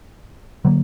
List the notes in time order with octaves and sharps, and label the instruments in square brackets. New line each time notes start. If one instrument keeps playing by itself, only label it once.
[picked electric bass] D3 F#3 A#3